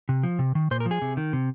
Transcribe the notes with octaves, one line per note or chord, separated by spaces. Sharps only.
C3
F3
C3
D#3
A#2 C5
A#4
F3
G#4
C3
D#3
C3